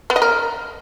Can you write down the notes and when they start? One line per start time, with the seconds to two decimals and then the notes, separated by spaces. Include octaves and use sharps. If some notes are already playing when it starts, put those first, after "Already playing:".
0.10 B3
0.16 D#5
0.22 A#4